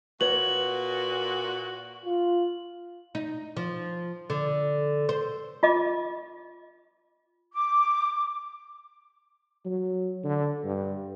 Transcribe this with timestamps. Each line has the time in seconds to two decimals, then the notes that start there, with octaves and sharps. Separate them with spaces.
0.21 A#2 F#4 B4 C#5 F#5 F#7
2.05 F4
3.15 D#4
3.57 F3
4.30 D3
5.09 C5
5.63 F4 D#5 D6
7.53 D6
9.65 F#3
10.24 D3
10.64 G2